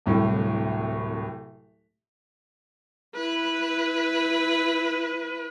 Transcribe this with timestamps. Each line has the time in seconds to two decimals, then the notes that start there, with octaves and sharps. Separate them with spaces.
0.06 D1 C2 A2
3.15 E4 B4